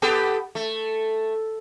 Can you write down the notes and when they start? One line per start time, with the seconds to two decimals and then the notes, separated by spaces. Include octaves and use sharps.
0.02 B3 G4 A4
0.55 A3